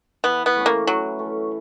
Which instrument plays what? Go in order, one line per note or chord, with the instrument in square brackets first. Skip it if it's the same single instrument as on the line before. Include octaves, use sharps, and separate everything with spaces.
[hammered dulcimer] E3 [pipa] B3
[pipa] B3
[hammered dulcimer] A3 C#4
[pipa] A#3
[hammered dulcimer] E3 [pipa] F#3
[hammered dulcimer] A3 C#4